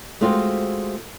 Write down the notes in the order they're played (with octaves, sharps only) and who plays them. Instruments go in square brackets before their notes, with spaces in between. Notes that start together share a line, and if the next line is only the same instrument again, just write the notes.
[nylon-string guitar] G#3 A3 C4 F4 F#4 C5